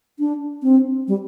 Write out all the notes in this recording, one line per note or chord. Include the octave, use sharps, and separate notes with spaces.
D4
C4
G3